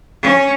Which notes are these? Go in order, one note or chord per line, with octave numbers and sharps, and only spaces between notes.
C#4